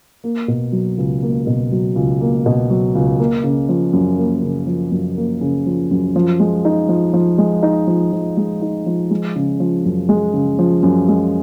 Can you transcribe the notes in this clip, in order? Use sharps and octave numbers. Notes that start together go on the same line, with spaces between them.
A#3
B2
F#3
C#2
A#3
B2
F#3
C#2
A#3
B2
F#3
C#2
A#3
C#3
F3
F#2
A#3
C#3
F3
F#2
A#3
C#3
F3
F#2
F3
G#3
D#4
F3
F3
G#3
D#4
F3
F3
G#3
D#4
F3
G#3
C#3
F3
F#2
G#3
C#3
F3
F#2
G#3